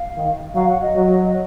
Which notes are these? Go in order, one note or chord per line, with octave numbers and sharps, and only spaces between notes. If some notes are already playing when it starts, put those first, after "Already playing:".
Already playing: F5
D#3
F#3 F5
F#5
D#5
F#3